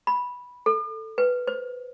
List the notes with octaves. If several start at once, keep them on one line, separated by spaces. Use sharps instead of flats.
B5
A4
B4
C5